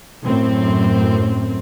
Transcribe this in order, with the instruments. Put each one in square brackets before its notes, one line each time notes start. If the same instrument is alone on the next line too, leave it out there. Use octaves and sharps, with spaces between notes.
[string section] F#2 A2 C4